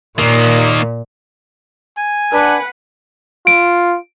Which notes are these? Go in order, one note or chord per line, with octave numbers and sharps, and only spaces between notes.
A#2 D#3 A#3
G#5
D4 B4 F#5
F4 D7